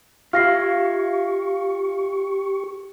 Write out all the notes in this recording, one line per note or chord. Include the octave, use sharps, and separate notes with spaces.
F4 G4 E5 F5 C#6 F6 A#6 C7